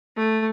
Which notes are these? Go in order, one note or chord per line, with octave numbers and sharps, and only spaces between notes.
A3